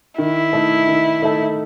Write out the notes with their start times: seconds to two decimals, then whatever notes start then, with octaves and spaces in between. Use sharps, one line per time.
0.18 D#3 E4
0.53 A3 D#4 A4
0.87 D#3
1.22 A3 D#4 A4